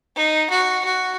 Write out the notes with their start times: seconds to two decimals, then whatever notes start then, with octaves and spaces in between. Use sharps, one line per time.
0.16 D#4
0.50 F#4
0.85 F#4